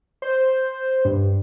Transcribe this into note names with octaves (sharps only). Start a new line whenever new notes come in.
C5
G2